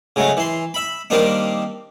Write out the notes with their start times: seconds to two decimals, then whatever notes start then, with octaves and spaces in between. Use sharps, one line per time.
0.16 C#3 F#3 G#3 A3
0.37 E3 C6
0.74 E5 B5
1.10 D#3 G3 A#3 C4 D4 D#4